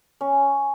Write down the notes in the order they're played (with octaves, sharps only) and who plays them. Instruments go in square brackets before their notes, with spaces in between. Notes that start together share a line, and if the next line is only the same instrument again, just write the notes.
[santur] C#4